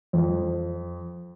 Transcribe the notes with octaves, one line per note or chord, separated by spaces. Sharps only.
F2